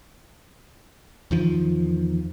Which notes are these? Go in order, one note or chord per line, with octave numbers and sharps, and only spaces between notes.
E2 D#3 F3